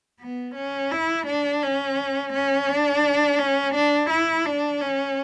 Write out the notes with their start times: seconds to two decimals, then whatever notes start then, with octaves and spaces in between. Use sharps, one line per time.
0.21 B3
0.55 C#4
0.92 E4
1.27 D4
1.62 C#4
2.33 C#4
2.69 D4
3.39 C#4
3.75 D4
4.10 E4
4.46 D4
4.81 C#4